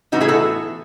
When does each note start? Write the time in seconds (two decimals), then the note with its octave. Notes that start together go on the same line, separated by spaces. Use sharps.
0.12 A2 E3 B3 D#4 F#4
0.21 E4 G#4
0.28 F#4 A4